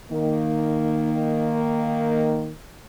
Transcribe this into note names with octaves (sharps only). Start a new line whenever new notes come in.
D#3 A#3